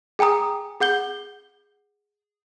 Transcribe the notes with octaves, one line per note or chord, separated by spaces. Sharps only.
G#4 G5 G#5 A#5 D#6
G#4 F#5 G6 G7